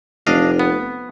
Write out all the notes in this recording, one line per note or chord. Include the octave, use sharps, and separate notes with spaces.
F1 D4 D#5 F5
B3